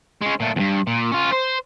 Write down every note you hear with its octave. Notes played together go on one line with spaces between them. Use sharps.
G#3 C#4
A#2 A3
E2 G2
A#2
C#4 F4
C5